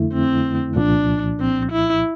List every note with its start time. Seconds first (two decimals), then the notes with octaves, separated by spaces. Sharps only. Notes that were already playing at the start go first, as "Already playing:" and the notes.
Already playing: F2 D3 A3 E4
0.13 C4
0.76 C2 A#2 F3 D4
1.40 C4
1.72 E4